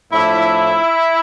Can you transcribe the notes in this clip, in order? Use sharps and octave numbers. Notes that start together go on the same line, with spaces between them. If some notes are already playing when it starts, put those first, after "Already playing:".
A2 F3 A3 D4 E4